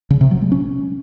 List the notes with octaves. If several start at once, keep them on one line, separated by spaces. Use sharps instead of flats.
C#3
C3
F#3
G#3
C#4